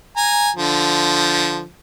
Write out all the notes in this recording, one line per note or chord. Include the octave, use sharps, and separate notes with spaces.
G#5 A#5
D3 F3